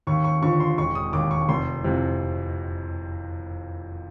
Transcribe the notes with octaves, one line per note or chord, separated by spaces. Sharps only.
D#2 C#6
C#6
D3 F3 C#6
C6
E1 C#6
D#6
D#2 D#3 D6
C#6
F1 C6
F2 C3 E3